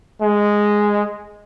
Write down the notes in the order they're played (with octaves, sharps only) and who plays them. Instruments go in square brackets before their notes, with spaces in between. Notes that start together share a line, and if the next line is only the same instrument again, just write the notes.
[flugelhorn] G#3